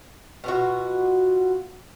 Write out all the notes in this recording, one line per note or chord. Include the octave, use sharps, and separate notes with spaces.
B2 F4 F#4